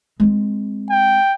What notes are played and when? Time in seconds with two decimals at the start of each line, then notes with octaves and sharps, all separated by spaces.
0.20 G#3 C4
0.90 G5